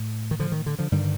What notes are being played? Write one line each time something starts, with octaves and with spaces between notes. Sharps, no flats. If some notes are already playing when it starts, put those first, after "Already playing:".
Already playing: A2
D#3
D3 F3
D#3
D3
D3 F3
G2 D3 D#3 G3